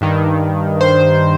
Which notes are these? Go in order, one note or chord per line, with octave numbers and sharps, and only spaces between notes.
G2 D#3
C5